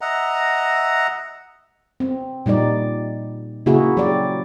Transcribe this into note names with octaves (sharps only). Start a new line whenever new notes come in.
D#5 E5 F#5 A#5
C4
A#2 G3 D#4 D5
C#3 A#3 E4 F#4 G#4
F#3 G4 D5